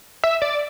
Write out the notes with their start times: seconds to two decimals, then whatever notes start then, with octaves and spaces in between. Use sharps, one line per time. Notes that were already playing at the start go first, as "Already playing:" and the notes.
0.24 E5
0.42 D5